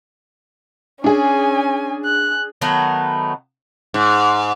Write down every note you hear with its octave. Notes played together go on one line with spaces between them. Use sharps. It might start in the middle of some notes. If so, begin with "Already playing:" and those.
C#4 D4 G#4 G#5
F#6
D#3 F#3 A3 B3
G#2